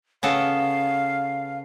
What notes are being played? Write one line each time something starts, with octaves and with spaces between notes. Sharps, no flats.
C#3 B3 A4 F5